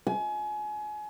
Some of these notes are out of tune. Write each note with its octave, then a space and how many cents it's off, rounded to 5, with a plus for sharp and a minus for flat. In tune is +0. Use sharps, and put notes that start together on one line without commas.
G#5 +30